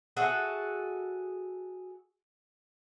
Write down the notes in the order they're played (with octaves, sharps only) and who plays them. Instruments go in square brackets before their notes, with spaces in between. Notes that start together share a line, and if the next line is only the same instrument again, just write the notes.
[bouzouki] F#4 G#4 A4 E5